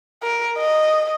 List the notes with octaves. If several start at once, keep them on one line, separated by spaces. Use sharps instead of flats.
A#4
D#5